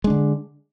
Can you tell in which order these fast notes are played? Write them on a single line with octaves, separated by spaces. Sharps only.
G#3 D4 D3